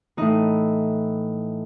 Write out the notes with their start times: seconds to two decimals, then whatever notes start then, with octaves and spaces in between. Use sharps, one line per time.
0.17 A2 E3 D#4